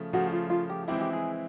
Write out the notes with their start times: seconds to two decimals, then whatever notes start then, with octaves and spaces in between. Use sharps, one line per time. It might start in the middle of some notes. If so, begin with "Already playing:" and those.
Already playing: C#3 F3 A3
0.13 C#3 F3 A3 F#4
0.32 F4
0.50 F4
0.70 G4
0.88 E3 G#3 C4 E4 G4
1.01 G4
1.13 G#4